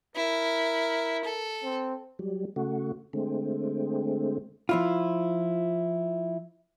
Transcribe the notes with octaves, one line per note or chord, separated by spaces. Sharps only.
E4 A#4
A4
C4
F#3 G3
C#3 A3 F#4
D3 G#3 A3 C4
F3 E4 F4